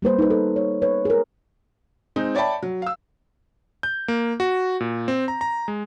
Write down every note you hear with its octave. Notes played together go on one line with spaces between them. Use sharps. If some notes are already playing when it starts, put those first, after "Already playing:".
G3 A#3 B4 C5
D#4 B4
A4
C#5
B4 C#5
G#4 A#4
G#3 C4 D#4
C#5 D5 E5 G5 A5 B5
F#3
F5 E6
G6
A#3
F#4
A#2
C4
A#5
A#5
G#3